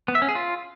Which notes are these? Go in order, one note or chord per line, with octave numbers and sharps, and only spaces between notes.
B3
E5
C#4
G#4
F4